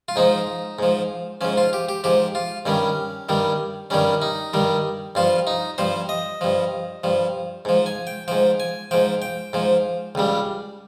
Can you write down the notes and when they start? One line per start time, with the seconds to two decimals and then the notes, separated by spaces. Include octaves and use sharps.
0.08 F4
0.16 G#2 F3 D#4
0.79 G#2 F3
1.41 G#2 F3 C#4
1.57 F4
1.73 G4
1.89 G4
2.04 G#2 F3 G4
2.35 F4
2.66 G2 D#3 G3 C#4
3.29 G2 D#3 G3
3.90 G2 D#3 G3 C#4
4.22 D#4
4.54 G2 D#3 G3
5.15 G2 F3 F4
5.47 D#4
5.78 G2 F3 C5
6.09 D#5
6.41 G2 F3
7.04 G2 F3
7.65 G#2 F3
7.86 G#5
8.07 G5
8.28 G#2 F3 G5
8.60 G#5
8.91 G#2 F3 G5
9.22 G5
9.53 G#2 F3
10.15 C#2 C#3 G3